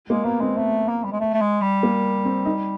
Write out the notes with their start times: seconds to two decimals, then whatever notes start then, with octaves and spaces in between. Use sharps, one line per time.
0.10 G#3 A#3
0.25 A#3 B3
0.41 G#3 C4
0.57 A3 B3
0.89 A#3
1.04 G3
1.12 G#3
1.20 A3
1.34 A3
1.41 G#3
1.61 G3
1.83 A#3
2.25 C4
2.46 D#4